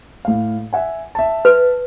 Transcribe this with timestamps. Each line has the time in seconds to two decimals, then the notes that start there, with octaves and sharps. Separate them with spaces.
0.25 A2 F5
0.73 E5 F#5 G#5
1.15 E5 A5
1.45 B4